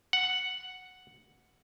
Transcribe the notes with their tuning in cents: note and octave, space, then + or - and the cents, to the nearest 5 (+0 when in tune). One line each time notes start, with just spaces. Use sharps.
F#5 +0